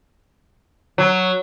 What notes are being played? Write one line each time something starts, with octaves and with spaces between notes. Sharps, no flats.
F#3